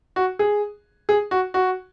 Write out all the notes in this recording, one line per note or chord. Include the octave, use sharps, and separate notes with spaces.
F#4
G#4
G#4
F#4
F#4